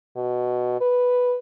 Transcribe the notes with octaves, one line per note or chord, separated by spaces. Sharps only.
B2
B4